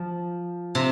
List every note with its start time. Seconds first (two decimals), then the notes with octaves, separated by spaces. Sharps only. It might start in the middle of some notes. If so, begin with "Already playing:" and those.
Already playing: F3
0.75 C3